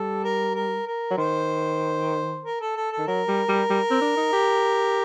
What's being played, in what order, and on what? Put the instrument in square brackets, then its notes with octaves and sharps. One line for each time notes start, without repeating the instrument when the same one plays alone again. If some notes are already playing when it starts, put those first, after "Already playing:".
Already playing: [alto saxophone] G3 [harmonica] A4
[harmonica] A#4
A#4
A#4
[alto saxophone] F#3
[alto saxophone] D#3 [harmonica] C5
[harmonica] A#4
A4
A4
A4
[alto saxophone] D#3
[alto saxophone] F#3 [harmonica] A#4
[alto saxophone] G3
G3
G3
C4
D4
D#4
G4